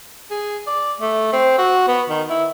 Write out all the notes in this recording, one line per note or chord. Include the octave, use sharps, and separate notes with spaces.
G#4
D5
A3
C4
F#4
B3
D#3
E4